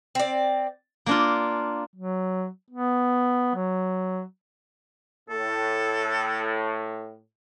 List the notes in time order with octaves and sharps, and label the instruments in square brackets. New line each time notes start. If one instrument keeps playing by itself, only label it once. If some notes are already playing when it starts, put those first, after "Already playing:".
[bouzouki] C4 D5
[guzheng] A#3 D4 F4
[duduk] F#3
B3
F#3
[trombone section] A2 [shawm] A4